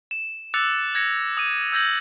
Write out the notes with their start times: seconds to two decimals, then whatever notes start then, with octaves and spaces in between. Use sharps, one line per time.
0.11 E7
0.54 D6 E6 F#6 A6 C#7 F7
0.95 G#6 A#6 C#7
1.37 D#6 D#7
1.72 E6 G6 G#6 A#6 F#7